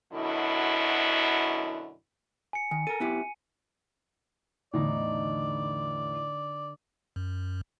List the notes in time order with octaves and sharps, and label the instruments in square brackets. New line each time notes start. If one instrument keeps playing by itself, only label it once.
[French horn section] F#2 B2 D3 E4
[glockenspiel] G#5 C#7
[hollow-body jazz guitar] D#3 [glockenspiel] G#5
[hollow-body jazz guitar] A4 A#4 [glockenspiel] D#7
[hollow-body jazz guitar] B3 E4 G4
[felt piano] E2 A2 [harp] D3 D#4 [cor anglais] D5
[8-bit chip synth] F#2